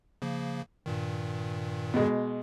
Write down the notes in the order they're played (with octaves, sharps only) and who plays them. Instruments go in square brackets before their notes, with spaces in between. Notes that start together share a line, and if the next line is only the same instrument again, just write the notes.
[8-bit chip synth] C#3 F3 A#3
G2 A#2 D#3
[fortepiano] B2 G#3